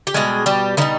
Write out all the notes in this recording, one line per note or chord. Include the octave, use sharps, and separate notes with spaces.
G4
B2 G3 G#3 G#4
G3 G4
B2 D#3 G3 D#4